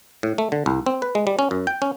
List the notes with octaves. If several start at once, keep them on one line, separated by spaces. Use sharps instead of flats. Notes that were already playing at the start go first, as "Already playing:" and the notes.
A2
A3
D3
C2
C4
B4
G#3
G3
C#4
F#2
G5
C#4